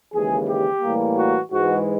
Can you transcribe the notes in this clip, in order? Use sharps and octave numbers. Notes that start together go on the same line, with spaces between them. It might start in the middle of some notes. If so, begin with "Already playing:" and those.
D#2 C#3 E3 G#3 G#4
G4
A2 E3 G3 A#3
F#4
G#2 E3 G#3 F#4